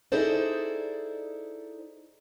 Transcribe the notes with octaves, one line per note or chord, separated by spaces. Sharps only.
D#4 E4 G#4 A4 C5 D5